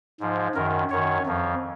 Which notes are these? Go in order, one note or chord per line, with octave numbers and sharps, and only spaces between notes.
G#2 F3
F#2 D#3 A#4
F#2 D#3 C#5
F2 F3